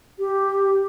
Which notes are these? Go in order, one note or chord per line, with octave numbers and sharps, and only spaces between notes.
G4